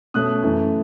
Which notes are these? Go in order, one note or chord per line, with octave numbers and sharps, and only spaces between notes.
B2 A3 C#4 D#6 F#6
F#2 E3 A3